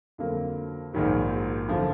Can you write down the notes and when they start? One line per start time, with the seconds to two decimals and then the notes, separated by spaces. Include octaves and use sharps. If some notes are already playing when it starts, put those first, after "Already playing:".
0.18 F2 D3 F#3 A#3
0.93 A#1 G#2 D#3 F#3
1.68 F#2 D3 F3